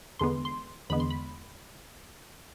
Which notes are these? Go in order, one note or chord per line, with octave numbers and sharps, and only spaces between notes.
E2 D3 G#3 B3 C6
C6
E2 D3 G#3 B3 B5
C6
B5